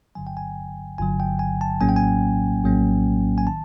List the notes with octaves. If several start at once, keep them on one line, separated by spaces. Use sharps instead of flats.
G1 G2 D3 F#3 G#5
G5
G#5
G1 G2 D3 F#3 G#5
G5
G#5
A5
A#1 A2 F#3 A#3 C#4 G#5
G5
G#5
A#1 A2 F#3 A#3 C#4
G#5
D#3 A5